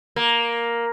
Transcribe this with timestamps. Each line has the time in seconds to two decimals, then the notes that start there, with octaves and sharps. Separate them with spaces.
0.16 A#3